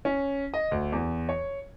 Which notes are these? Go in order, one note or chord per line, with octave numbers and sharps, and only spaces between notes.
C#4
D#5
D2
E2
C#5